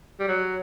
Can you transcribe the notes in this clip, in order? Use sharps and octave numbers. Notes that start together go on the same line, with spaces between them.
G3
F#3